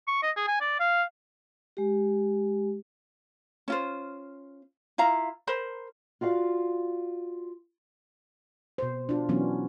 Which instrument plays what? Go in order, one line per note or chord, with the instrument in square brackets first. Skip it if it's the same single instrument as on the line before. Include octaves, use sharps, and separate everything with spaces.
[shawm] C#6
D#5
G#4
G#5
D5
F5
[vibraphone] G#3 G4
[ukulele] C#4 F4 C5
E4 F4 F5 A#5
A#4 C5 B5
[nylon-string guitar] F4 F#4 D5 F5
[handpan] B2 C5
D4 F4
B2 E3 F#3 B3 C#4